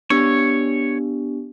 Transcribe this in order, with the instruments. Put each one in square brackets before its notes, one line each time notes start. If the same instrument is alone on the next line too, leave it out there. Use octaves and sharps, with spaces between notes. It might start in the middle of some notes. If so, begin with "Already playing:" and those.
[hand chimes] B3 D4 G4 [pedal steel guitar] C#5